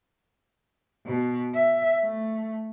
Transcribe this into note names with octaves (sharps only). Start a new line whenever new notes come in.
B2
E5
A3